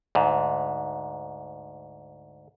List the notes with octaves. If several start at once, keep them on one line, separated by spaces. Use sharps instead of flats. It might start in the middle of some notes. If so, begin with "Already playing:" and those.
D2 G#2